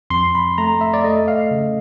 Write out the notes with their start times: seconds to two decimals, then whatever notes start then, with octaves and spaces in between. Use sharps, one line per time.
0.10 F2 C6
0.35 B5
0.58 A3 A#5
0.81 E5
0.94 D5
1.04 A3 D#5
1.28 F5
1.51 C#3